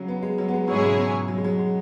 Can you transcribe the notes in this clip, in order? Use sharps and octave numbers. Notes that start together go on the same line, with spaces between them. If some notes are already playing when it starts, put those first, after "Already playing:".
Already playing: C#3 F#3
B3
G#3
F#3
B3
G#3
G#2 F#3 G#3 E4 G#4 C#5
B2
C#3
B2
F#3
G#3
F#3
G#3